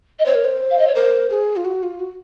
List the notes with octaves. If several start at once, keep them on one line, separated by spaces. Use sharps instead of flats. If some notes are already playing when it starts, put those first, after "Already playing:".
D#5
C5 C#5
A#4
C5
F5
D#5
C#5
A#4 C5
G#4
F4
F#4
F4
F#4